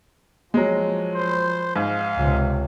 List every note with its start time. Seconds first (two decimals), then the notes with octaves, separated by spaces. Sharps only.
0.54 F3 F#3 G#3
1.15 C5
1.76 G#2 F5
2.17 C#2 C3